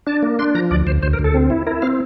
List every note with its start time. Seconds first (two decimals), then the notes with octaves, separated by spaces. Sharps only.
0.07 D4 A5
0.23 A#3
0.39 D4 C6
0.55 F3 A#5
0.71 D2 D5
0.87 D2 C5
1.03 D2 C5
1.13 A#4
1.19 D2
1.24 A4
1.34 C4
1.50 E4
1.67 E4 A#4
1.82 C4 F5